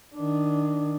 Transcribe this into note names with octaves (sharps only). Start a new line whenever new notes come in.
D#3 D4